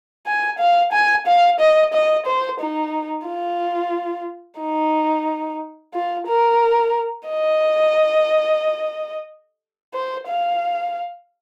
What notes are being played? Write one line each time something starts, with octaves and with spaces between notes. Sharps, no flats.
G#5
F5
G#5
F5
D#5
D#5
C5
D#4
F4
D#4
F4
A#4
D#5
C5
F5